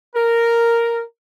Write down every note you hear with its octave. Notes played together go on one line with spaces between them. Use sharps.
A#4